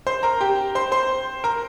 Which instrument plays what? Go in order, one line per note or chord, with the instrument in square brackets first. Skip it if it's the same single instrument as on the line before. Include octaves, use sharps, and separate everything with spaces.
[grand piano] C5 C6
A#4 A#5
G4 G5
C5 C6
C5 C6
A#4 A#5